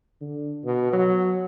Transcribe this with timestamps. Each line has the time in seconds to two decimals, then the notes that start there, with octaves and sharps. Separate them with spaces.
0.21 D3
0.65 B2
0.93 F#3